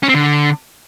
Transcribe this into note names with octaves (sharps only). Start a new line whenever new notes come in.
C#4
C4
D3